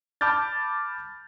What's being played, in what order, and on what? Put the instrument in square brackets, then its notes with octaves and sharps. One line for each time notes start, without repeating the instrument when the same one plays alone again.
[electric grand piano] A5 B5 D6 F6 G6 A6